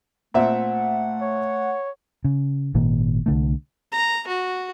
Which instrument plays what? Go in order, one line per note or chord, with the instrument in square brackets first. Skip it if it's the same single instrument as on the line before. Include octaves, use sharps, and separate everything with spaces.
[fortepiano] A#2 C4 E5 [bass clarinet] A3 [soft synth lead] F#5
[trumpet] C#5
[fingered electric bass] C#3
G#1 A#2 D#3 A#3
C2 D3 A3
[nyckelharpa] A#5
F#4